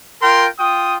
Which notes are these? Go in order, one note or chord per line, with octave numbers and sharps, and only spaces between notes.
F4 A#4 G5 C6
F4 G5 D#6